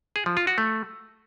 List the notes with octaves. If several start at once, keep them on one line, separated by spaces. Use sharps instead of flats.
G#4
F3
F4
F#4
A3